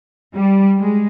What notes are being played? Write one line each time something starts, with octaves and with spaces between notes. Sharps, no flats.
G3
G#3